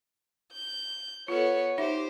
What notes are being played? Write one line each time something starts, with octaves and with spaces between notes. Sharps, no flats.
G6
B3 F4 A4 C#5
D#4 G4 C5 E5